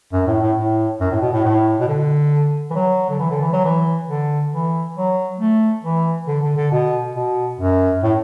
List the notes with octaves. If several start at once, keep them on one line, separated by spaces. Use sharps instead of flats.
F#2
A2
A2
A2
F#2
A2
B2
A2
A2
B2
D3
E3
F#3
D3
E3
D3
E3
F#3
E3
D3
E3
F#3
A3
E3
D3
D3
D3
B2
B2
F#2
A2